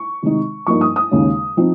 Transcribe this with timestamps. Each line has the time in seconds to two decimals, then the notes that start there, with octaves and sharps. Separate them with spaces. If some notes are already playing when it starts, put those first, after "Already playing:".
Already playing: C#6
0.22 C3 D#3 G#3 D#4
0.67 G2 F3 A#3 D#4 C#6
0.81 D#6
0.96 D#6
1.11 D#2 C#3 G#3
1.57 F3 C4 D#4